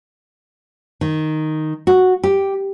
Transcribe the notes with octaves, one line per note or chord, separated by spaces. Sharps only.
D#3
F#4
G4